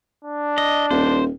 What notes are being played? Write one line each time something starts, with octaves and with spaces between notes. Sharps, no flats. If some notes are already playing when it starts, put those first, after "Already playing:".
D4
D#5
D#1 C5